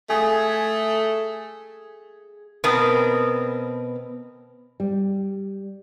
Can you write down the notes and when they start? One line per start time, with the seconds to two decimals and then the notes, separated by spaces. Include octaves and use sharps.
0.10 A3 G#4
2.64 B2 B3 C4 A#4
4.80 G3